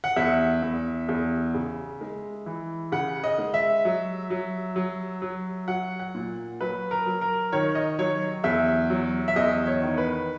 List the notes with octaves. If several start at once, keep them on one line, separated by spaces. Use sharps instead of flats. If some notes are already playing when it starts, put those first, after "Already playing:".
F#5
E2 E5
E2
E2
C#3
G#3
E3
C#3 F#5
D#5
G#3
E5
F#3
F#3
F#3
F#3
F#3 F#5
F#5
A#2
F#3 B4
A#4
F#3
A#4
D#3 C#5
D#5
F#3 C#5
E2 E5
F#3
E5
E2 D#5
C#5
D#3
B4